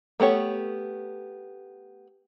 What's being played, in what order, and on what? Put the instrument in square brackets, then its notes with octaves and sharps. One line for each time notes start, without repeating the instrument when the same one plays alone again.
[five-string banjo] A3 B3 G4 C#5